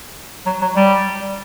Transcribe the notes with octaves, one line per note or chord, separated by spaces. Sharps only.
F#3
F#3
G3